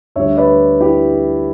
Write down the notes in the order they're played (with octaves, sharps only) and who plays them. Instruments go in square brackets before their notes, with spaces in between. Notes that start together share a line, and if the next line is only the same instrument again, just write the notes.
[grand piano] D2 D3 G3 C#5 E5
B4 D5
E4 G4